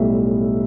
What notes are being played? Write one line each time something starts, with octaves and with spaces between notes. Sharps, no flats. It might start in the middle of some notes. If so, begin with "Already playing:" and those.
Already playing: B1 A2 G3 E5